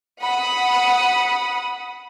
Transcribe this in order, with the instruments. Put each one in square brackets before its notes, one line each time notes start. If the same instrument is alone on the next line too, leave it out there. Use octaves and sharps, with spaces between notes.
[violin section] F#5 B5 D#6